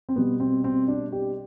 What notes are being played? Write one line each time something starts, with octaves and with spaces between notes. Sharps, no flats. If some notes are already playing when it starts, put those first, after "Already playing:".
C4
B2 G3 B3
C4
C4
D4
G4